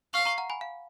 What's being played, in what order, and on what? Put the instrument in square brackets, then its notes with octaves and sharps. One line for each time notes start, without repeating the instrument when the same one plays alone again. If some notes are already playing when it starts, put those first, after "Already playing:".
[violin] F5 [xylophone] C#6 F6
[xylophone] A#5 C#6
F#5 A#5
G#5 B5
F5